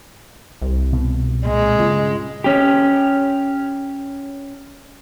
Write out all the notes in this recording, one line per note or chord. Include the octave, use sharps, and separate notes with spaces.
C2
B2
A#2 G#3 C4
G2 C#3 F4
C#4 G4